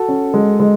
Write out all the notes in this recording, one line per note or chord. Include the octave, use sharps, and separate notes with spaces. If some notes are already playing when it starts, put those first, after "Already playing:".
Already playing: F#4 A4
C#4
G#3
G#3